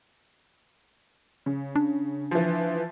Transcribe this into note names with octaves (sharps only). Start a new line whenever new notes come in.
C#3
D4
E3 F3